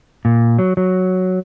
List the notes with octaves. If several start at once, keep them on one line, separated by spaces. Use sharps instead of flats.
A#2
F#3
F#3